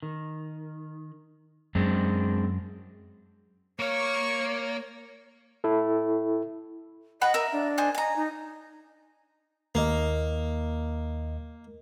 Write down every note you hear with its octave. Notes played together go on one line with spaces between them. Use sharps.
D#3
F#2 G#3 C4 D4
A#3 C#5 F5 C#6
E4 A4
B4 D#5 F#5 B5
A#4 E5
D4
C5 D#5 G#5
D#5 G#5 A#5
D#4
D#2 A#3 D#5